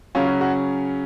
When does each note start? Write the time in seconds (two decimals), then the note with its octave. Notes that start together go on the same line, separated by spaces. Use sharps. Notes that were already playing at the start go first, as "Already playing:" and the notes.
0.15 C#3 F#3 C#4 F4
0.27 F#4
0.41 F#4